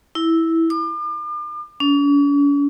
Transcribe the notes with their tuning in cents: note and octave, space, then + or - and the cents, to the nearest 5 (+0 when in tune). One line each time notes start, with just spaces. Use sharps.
E4 -10
D6 +40
C#4 +45